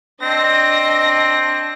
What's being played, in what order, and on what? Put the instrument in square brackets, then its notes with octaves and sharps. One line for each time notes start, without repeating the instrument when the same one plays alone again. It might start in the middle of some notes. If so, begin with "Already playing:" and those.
[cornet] C4 [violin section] D4 D#5 A#6